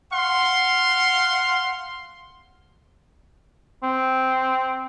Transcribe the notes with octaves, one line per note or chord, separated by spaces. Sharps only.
F5 F#5 C6
C4